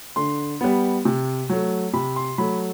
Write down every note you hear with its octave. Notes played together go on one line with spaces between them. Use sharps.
D3 C6
G3 B3
C3
F#3 A3
C3 B5
C6
F#3 A3 B5